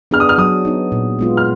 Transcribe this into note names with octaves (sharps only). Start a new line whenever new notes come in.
B3 D4 G#4 F6
D#6
F6
F#3 D#6
B3 D#4
A#2
G#3 B3 F4
F6